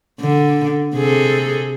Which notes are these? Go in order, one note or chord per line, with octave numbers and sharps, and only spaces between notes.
D3
C3 G#4 A4